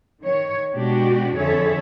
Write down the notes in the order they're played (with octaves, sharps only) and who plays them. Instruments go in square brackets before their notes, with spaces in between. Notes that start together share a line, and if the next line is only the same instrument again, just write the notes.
[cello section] D#3 C#5
B2 G#3 D4 F#4 G4
F2 D3 G#4 A4 C#5 E5